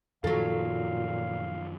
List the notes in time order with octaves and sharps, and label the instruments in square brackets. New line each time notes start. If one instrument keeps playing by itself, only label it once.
[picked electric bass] F#2 D#3 F3 [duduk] A#2 [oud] F#3 A4 [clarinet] F5